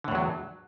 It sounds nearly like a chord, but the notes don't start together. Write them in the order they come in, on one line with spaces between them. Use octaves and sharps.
D3 A2 E2 F#3